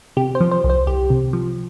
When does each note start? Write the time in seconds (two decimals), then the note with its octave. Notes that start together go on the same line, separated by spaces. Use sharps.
0.17 C3 G4
0.35 C5
0.40 F3
0.51 C5
0.64 C2
0.70 C5
0.87 C2 G4
1.10 C3
1.33 F3